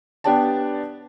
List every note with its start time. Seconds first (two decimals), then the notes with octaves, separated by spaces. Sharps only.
0.24 B3 D4 G4 D5 G5 A5